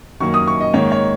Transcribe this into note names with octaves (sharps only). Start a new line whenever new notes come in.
F#2 D#3 A#3 C#6
D#6
C#6
D#5
G#2 D#3 A#3 C#5
C#5